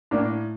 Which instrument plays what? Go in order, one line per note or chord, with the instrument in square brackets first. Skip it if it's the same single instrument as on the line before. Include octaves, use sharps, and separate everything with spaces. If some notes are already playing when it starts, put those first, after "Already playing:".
[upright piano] A2 [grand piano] A#3 D4